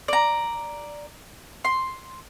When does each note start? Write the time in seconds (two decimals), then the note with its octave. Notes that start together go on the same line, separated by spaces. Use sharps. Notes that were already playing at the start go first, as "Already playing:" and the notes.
0.08 D5 A#5
1.64 C6